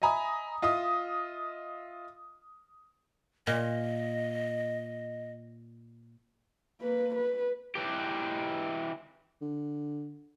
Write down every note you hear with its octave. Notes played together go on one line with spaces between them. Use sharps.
D#5 E5 G#5 A#5 B5 D#6
F4 D#5 E5 D#6
A#2 D#5
A#3 B4
B4
E3 G4
D3